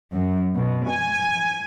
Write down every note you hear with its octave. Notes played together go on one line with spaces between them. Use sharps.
F#2
B2
G#5